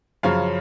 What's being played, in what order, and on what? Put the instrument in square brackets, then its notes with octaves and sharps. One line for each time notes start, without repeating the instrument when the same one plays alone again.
[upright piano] F#2 C#3 F3 C#5 F5